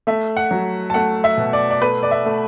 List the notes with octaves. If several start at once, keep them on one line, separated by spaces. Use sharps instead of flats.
A3 E5
F#5
F#3
A5
A3 F#5
E5
B2
D5
D5
A3 B4
D5
E5
A3